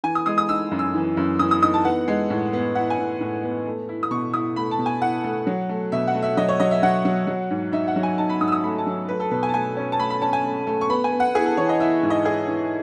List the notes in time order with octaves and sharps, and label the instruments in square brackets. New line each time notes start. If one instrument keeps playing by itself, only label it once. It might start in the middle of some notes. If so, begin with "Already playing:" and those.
[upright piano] E3 G#5
D#6
G#3 D#6
D#6
D#4 E6
F#2
E6
E3
F#2
E3 D#6
D#6
D#4 D#6
A5
B3 F#5
G#3
A2
B3
E4 F#5
G#5
A2
A2
B3
A3
E4
D#6
B2 C#6
E4 D#6
A3 B5
A5
B2
G#5
E4 F#5
A3
F#3
A3
B2 E5
F#5
A3
E5
F#3 D#5
C#5
F#3 D#5
E5
F#3 F#5
F#3
F#3
G#2
D#4 E5
F#5
F#3
G#5
D#4 A5
B5
G#2 D#6
E6
D#6
A3 B5
A5
F#3
A3 B4
A4
B2 B4
G#5
A5
A3 G#5
C#4
A5
A3 B5
B5
C#4 A5
G#5
A3
A3
C#6
B3 B5
G#5
B3
F#5
E4 G#4
A4
E3 C#5
D#5
E4 E5
G#2
D#5
E4 G#4
E3